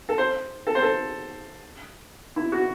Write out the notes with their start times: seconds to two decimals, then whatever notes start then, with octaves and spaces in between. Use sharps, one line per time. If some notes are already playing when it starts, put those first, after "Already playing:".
0.09 A4
0.18 C5
0.67 A4
0.75 C5
0.82 A4
2.36 E4
2.52 F#4